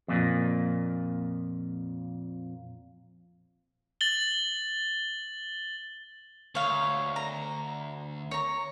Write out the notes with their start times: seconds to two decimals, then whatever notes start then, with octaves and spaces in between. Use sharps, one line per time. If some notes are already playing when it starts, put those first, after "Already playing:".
0.08 F2 A#2
4.01 A6 F#7 G7
6.55 D2 C#5 F5
7.16 A#5
8.31 C#5 A#5